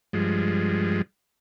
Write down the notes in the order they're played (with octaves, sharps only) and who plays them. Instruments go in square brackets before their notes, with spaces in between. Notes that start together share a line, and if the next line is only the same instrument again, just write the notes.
[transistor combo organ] G2 F3 G#3